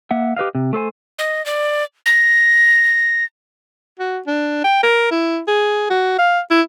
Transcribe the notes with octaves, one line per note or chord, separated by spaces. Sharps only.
A#3 E5 F#5
G4 B4 D#5 F5
C3
A3 A4 C5 G#5
D#5
D5
A#6
F#4
D4
G5
A#4
E4
G#4
F#4
F5
E4